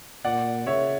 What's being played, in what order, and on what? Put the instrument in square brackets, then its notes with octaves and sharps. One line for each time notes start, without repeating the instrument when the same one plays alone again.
[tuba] A#2 [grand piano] D5 F#5
[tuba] C#3 [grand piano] C#5 E5